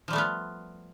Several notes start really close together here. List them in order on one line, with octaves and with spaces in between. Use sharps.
F3 G3 A3 B3 F4